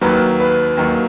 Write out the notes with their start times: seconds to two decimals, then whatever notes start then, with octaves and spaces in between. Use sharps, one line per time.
0.01 D#2 D#3 F#3 B4
0.40 B4
0.77 D#2 D#3 F#3